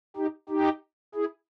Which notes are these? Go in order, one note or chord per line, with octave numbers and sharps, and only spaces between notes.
D#4 G4
D#4 G4
E4 G#4